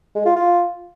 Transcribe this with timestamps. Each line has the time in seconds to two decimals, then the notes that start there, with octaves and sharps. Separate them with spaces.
0.15 G#3
0.25 F4
0.36 F4